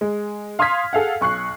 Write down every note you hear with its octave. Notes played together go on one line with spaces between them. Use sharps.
G#3
F5 C6 D#6 F6 G#6 B6
G#4 A4 F5 F#5
B1 C#6 F#6 C7